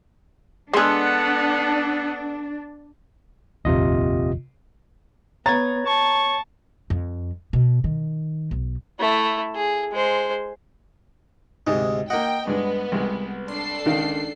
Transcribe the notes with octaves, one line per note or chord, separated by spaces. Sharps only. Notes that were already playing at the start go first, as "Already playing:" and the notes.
G#3 B3 D4 G#4 A4 F#5 C6
F1 A#1 D#2 C3 F4 D#5
B3 C#5 A#5 G#6 A6
A5 C#6
F2
B2
D#3
B1
A3 E4
G#4
G#3 C5
D2 G#2 C3 G#3
A#3 D#5 F#5 G5
G2 G#3 B3
C2 G#3
D4 A4 C6 C7
C#2 D#3 F5